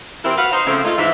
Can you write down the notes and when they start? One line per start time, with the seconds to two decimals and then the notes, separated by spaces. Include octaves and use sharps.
0.24 E3 C4 E4 G4 A#4
0.38 F#4 B4 F5
0.52 D#4 C5
0.67 C#3 F3 A3 C4
0.84 G#3 A3 D#4 F4
0.98 G#2 E3 F3 E5